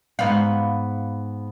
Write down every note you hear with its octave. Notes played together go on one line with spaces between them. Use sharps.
G#2 B3 F5